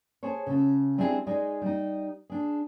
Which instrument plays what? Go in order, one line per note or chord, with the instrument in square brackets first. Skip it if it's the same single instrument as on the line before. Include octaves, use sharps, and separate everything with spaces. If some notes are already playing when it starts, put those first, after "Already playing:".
[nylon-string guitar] G#4 A4 C5 C#5
C#3 A4
G#3 C4 D4 E4 G4 G#4
G#3 D#4 G#4 D5
G3 D#4
D4 G#4